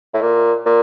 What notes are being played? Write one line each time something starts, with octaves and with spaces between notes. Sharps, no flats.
A2
A#2
A#2